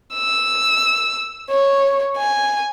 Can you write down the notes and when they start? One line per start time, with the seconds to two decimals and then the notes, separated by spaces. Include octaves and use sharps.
0.14 E6
1.51 C#5
2.17 G#5